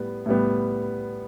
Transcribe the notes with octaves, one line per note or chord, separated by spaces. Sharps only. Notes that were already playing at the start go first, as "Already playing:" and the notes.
Already playing: A2 G3 B3
A2 G3 B3